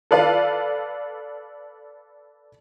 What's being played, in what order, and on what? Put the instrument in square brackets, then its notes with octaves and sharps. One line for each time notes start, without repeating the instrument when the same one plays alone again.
[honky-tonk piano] A4 B4 D5 F5